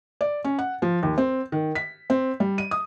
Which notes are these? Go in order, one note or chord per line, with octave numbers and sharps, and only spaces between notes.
D5
C#4
F#5
F3
D#2
C4
D#3
B6
C4
G3
D#7
D#6